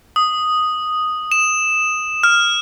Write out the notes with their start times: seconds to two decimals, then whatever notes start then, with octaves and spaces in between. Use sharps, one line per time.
0.16 D#6
1.32 E7
2.23 F6